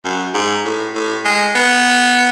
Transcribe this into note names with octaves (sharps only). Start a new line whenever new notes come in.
F#2
G#2
A2
A2
G#3
B3